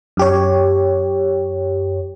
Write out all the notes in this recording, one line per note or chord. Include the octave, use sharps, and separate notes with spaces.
F#2 G4 C#5